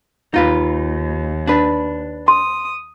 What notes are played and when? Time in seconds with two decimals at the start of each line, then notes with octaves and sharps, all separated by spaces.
0.34 D#2 D#4 F4 B4
1.47 D4 B4
2.28 C6 D#6